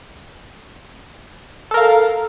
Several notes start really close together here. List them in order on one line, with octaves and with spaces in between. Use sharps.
A4 A#4 F5